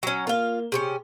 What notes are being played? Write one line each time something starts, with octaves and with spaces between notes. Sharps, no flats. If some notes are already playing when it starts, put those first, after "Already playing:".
F#3 C#4
A#3 F4 A#4 F5 G7
C3 C4 C#4 G#4